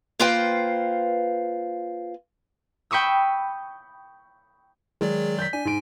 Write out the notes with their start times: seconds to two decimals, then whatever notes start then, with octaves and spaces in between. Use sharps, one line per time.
0.19 A#3 F4 B4 C5 F5 G5
2.91 G5 B5 C#6 D#6 E6
5.01 D#3 F#3 G#3 D5
5.39 G6 B6
5.53 D4 G#5
5.65 G#2 D7